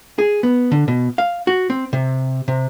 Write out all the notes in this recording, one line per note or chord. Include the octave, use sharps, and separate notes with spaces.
G#4
B3
D3
B2
F5
F#4
C4
C3
C3